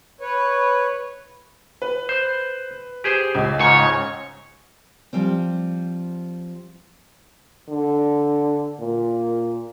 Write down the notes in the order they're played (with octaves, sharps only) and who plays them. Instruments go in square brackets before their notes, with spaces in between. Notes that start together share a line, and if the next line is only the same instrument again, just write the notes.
[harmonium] B4 C#5
[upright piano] B4
[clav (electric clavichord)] C5
G4 G#4 C5
[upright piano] C#2
[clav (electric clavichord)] G#2 C#3 [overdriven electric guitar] C#5
[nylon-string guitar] F3 G3 C4
[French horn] D3
A#2